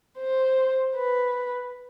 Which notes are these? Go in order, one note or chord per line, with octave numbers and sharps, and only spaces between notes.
C5
B4